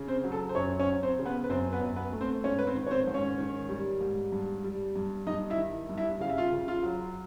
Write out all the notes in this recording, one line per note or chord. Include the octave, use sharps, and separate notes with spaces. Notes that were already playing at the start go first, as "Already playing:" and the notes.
Already playing: C#3
C4 C5
F#3
A4
C5
F#2 C#4 C#5
C#4 C#5
F#3
C4 C5
C#3
B3 B4
B4
F#2 C4 C5
B3 B4
F#2
B3 B4
A3
C4 C5
G#2 C#4 C#5
B4
C4 C5
D#3
C#5
C4 C5
G#2
C#4 C#5
D#3
G3
G#2
G2
G3
G2
G2 D#4 D#5
E4 E5
D#3
G2
E4 E5
C#3 F5
E5
F4 F5
C#3
F4 F5
F#3